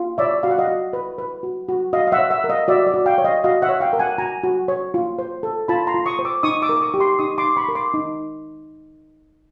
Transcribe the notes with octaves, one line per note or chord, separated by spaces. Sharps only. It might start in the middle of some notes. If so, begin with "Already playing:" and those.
Already playing: F4
C#5 D5 E5
F#4 F5
F#5
D#5 F5
F#4
B4
B4
F#4
F#4
F#4 D#5 F5
F5
E5 F#5
C#5
E5 F#5
A#4
D#5 F5
F#4 D5 E5
D5
F#4
F5 G5
C#5
D#5 F5
F#4 D#5 F5
E5 F#5
C#5
F5 G5
A#4
F#5 G#5
F#4 G#5 A#5
F#4
C#5
F4
C5
A4
F4 A5 B5
A#5 C6
F4
C#6 D#6
C5
D6 E6
D#4 C#6 D#6
D6 E6
A#4
C#6 D#6
G4
C6 D6
D#4 C#6 D#6
C6 D6
D#4
B5 C#6
A#4
C6 D6
D#4